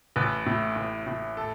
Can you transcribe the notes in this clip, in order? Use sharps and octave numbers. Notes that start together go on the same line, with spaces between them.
A1 B4
A2
A1
A2
A4